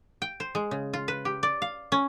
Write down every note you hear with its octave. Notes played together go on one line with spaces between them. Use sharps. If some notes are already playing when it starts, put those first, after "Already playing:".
G5
C5
G#3
C#3
F4
B4
G4
D5
F5
C#4